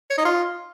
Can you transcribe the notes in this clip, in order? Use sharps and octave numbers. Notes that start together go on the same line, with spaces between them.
C#5
D#4
F4